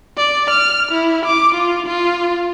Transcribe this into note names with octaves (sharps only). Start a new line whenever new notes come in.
D5
F6
E4
D6
F4
F4